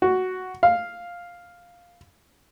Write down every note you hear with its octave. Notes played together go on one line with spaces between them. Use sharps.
F#4
F5